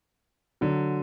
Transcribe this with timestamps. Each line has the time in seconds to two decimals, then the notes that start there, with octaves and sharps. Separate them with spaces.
0.61 D3 F#3